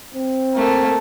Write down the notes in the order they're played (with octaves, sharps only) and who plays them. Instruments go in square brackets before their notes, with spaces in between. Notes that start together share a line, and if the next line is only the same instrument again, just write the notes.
[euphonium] C4
[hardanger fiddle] A3 A#3